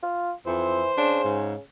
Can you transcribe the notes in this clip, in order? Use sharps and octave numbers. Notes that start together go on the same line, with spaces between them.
F4
F2 E3 C5
C#3 D4
G#2